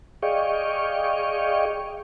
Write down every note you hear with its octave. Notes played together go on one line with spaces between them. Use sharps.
G#4 D5 D#5 F5 G5 C#6